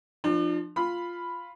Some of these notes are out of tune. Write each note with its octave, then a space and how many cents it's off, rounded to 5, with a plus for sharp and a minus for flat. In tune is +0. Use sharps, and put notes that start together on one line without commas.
F3 +0 D4 +40
F4 +0 B5 +0